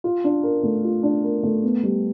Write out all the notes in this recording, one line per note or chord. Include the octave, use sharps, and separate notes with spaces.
F4
D4
A#4
A3
F4
D4
A#4
A3
B3
G3